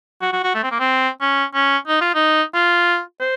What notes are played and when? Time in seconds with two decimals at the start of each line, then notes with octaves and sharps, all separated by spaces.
0.21 F#4
0.33 F#4
0.44 F#4
0.55 A3
0.63 C4
0.71 A#3
0.80 C4
1.21 C#4
1.54 C#4
1.87 D#4
2.01 F4
2.15 D#4
2.54 F4
3.21 C5